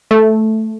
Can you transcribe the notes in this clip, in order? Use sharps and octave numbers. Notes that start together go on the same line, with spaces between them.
A3